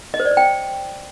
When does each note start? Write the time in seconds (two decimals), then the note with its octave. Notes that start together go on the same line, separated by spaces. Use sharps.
0.14 D#5
0.20 C5
0.25 D5
0.31 C5
0.37 G5